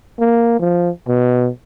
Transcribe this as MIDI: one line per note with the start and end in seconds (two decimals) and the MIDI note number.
0.20 0.60 58
0.60 0.89 53
1.08 1.49 47